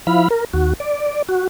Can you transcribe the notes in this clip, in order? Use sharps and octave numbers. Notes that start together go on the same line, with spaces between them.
F3 E4 F5 B5
A#4
D#2 F#4
D5
F#4